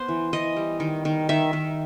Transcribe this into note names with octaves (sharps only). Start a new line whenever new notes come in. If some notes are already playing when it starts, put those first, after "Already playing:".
Already playing: B3 C5
E3
E3 D#5
G3
D#3
D#3
D#3 E5
D#3